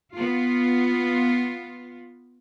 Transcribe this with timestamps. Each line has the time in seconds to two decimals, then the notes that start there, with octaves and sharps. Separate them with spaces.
0.14 B3 F4